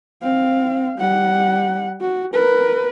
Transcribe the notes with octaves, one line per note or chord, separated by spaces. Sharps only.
C4 F5
G3 F#5
F#4
A#4 B4